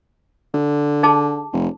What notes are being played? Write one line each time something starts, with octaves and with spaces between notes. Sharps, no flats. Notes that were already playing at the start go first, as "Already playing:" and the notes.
D3
D#4 G#4 A5
F1